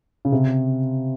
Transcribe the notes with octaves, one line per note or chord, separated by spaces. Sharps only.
C#3
C3